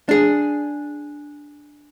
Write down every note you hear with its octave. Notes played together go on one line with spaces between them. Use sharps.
D4 G#4